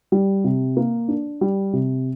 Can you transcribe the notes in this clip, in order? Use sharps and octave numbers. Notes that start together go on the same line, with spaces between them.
G3
C3
A#3
D4
G3
C3